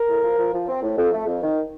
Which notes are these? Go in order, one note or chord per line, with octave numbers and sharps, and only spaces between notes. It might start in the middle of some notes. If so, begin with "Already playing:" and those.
Already playing: A#4
A2
F3
F3
F3
C4
A2
F2
A3
F2
D#3